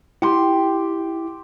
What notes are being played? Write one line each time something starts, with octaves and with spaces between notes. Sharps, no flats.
E4 G4 C6